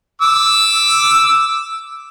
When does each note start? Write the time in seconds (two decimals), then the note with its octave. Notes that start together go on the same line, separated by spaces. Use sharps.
0.22 D6 E6